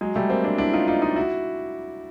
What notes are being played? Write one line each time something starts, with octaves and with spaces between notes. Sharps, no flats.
F#3 G#3
G3 A3
A#3 C4
C4 D4
D4 E4
D#4 F4
D#4 F4
D#4 F4
E4 F#4